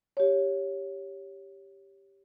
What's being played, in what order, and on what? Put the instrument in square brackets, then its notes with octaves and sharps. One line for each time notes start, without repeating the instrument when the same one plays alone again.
[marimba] G4 C#5